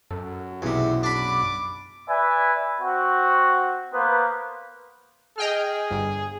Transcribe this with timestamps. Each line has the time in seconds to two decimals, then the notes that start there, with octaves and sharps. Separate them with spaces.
0.11 F#2 A4
0.62 B1 E2 C3 G#4 G#5
1.03 D4 B5 D6
2.09 B4 D5 E5 G#5
2.81 C4 F#4
3.94 A#3 B3 B4 C5
5.38 G#4 D#5 G5 F6
5.91 G1